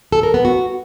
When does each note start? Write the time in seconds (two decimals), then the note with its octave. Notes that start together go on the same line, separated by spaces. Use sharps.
0.12 A4
0.23 A#4
0.34 B3
0.45 F#4